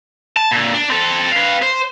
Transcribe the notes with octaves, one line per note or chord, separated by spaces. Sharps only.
A5
A#2 D3
D4
C4 A4
B4 F5
C5